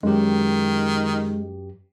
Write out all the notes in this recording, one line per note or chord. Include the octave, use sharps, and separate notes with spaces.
F#2 D#3 G#3 G4